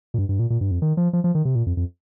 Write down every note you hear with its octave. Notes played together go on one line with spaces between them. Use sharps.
A#2
G2
G2
A#2
A#2
G2
F2
D#3
F3
F3
F3
D#3
C3
A#2
F2
F2